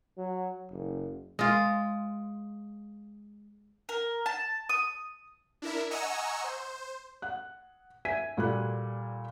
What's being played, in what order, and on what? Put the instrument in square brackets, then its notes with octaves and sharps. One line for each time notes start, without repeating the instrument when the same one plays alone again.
[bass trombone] F#3
F#1
[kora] G#3 F4
[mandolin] A#4
A5
D#6
[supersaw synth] D4 E4 A#4 E5
D#5 F#5 G#5 A#5 C#6 E6
C5
[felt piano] F#5 F#6
E5 G#5 G#6 B6 D#7
A#2 G3 F#4 A4 F#6